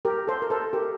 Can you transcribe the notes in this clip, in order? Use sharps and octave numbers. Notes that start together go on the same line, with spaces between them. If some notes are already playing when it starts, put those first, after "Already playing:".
G4 A#4
A4 C5
A#4
A4 C5
G4 A#4